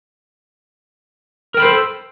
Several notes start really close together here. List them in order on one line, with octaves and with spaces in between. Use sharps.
A#4 G5 B5 C5 A4